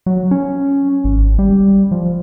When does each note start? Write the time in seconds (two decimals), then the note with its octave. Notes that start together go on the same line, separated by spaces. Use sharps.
0.06 F#3
0.31 C#4
1.04 G#1
1.39 G3
1.91 F3